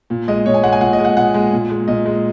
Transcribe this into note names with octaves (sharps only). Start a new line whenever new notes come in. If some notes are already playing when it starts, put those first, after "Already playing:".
A#2
G#3 D#5
A#2 C#5
G#5
G#3 F#5
G#5
A#2 F#5
D#5
G#3
F#5
A#2 F#5
G#3
A#2
G#3
A#2 D#5
G#3